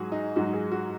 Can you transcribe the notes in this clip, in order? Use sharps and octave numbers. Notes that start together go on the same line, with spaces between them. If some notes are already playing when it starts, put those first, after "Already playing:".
Already playing: G#2 F#3 F#4 G#4
D#4
G#2 F#3 F#4
G#4
F#4